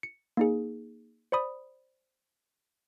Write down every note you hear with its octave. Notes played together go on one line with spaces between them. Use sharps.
C#7
A#3 D#4 G#4
C5 D5 B5 D#6